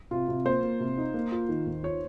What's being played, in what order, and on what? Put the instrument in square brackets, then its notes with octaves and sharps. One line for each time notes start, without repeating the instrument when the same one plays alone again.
[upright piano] C3 [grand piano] F4
[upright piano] C3
[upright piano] A#3 [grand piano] C5
[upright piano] A#3
C3
D#4
A#3
F4
D#3
D#2
[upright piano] F4 [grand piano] C#5